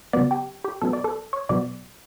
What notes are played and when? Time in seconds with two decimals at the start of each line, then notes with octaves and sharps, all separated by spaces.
0.13 C#3 F#3 B3 D5
0.31 G4
0.65 G4
0.82 B2 F#3 B3 A4
0.93 D5
1.04 A4
1.33 C#5
1.49 B2 F#3 B3 D5